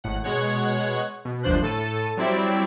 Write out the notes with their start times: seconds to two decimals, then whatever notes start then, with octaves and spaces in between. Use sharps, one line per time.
0.04 G#1 A2 F#5
0.24 B2 G#3 C#5 F#5 G#6
1.25 B2
1.43 G1 D#2 F3 D4 C5 F#6
1.62 A2 A4 A5 D#7
2.17 F#3 G3 C4 E4 D5 E5